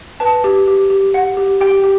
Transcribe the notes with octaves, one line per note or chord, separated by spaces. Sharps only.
B4 A5
G4
G4
G4
F#5
G4
G4 G5
G4